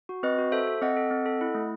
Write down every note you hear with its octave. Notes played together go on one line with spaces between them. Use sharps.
F#4
C4 B4 D#5
F#4
A4 C5 E5
A4
C4 D#5 F#5
A4
C4
A4
E4
A3